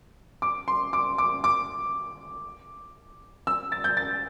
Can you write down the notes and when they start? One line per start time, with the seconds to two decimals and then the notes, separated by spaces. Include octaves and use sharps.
0.42 D6
0.68 C6
0.93 D6
1.18 D6
1.44 D6
3.47 E6
3.72 A6
3.84 G6
3.97 A6